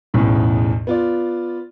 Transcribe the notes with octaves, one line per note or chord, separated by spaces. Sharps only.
B1 E2 A2 C#3
B3 F4 D5